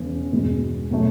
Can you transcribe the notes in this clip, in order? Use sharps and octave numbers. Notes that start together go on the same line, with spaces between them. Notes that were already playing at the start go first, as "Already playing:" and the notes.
Already playing: E1 E2 C#3
E1 E2 B2 G#3
B2 F#3 A3